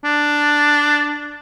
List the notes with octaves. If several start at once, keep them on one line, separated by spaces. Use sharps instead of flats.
D4